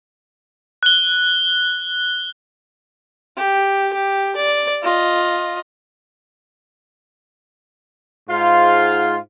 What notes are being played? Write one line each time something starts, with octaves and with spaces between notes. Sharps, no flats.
F#6 G7
G4
G4
D5
F4 D#5
G#2 F4